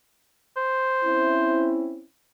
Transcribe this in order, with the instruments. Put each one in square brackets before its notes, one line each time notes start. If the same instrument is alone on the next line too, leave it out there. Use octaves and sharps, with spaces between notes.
[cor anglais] C5
[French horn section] C4 C#4 E4